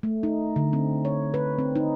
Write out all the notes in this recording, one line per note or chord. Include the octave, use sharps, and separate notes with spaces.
A3
D#4
D3
C4
C#5
B4
C4
D#4